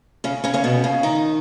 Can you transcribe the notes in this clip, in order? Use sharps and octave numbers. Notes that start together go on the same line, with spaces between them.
C#3 C#4
C#3 C#4
C#3 C#4
B2 B3
C#3 C#4
D#3 D#4